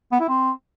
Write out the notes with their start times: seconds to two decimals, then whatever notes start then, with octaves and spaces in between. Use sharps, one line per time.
0.12 B3
0.20 E4
0.28 C4